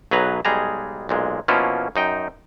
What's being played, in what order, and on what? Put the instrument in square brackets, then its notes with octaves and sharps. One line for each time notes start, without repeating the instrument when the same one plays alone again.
[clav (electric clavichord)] B1 F#3 G#4 B4 A#5
B1 G3 G#3 G#4 A#5
B1 A#2 G#3
B2 F3 A#3 C#4 E4 F4
F#2 D#4 G5